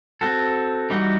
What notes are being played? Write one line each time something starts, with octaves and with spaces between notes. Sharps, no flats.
C4 F#4 A4
E3 G3 D#4 F#4